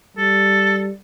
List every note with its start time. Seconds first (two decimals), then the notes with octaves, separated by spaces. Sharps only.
0.18 G3 A4